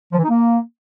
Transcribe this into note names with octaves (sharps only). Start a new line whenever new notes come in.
F3
E3
D#4
A#3